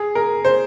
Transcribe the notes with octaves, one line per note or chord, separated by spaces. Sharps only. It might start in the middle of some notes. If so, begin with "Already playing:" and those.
Already playing: G#4
A#4
C5